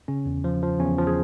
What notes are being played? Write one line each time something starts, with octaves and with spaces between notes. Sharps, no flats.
C#3 C#4
E2
F3
F3
E2 C#4
F3
G#4